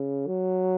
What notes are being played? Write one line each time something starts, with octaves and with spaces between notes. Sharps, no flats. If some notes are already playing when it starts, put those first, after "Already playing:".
Already playing: C#3
F#3